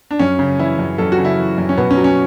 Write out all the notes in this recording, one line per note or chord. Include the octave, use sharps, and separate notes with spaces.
D4
F#2 C#4
C#3
E3 E4
F#2
F#2 A4
F#4
C#3
E4
E3
F#2
C#4
B2 B3
C#4
F#3
C#4